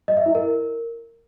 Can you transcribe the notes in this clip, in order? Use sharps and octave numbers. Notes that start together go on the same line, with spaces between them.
D#5
E5
E4
A#4